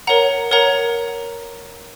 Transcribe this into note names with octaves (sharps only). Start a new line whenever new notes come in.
A#4 C#5 F#5 A#5
A#4 C#5 F#5 A#5